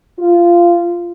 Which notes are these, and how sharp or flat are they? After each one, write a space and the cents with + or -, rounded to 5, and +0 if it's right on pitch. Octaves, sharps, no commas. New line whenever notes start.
F4 -15